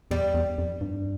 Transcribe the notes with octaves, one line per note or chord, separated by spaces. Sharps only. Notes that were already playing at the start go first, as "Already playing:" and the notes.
E2 G3
E2
F2
G2